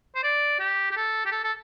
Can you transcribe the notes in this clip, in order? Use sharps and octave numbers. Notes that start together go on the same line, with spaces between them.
C5
D5
G4
G4
A4
G4
A4
A4